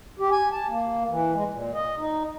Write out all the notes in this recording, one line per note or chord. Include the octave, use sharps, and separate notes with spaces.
G4
G#5
A5
A#3
E3
G#3
A#2
D#5
D#4